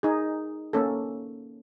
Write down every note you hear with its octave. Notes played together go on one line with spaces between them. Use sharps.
D#4 G#4
A#3 C#4 A4